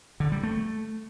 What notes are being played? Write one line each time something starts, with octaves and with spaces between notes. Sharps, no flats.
D3
G3
A3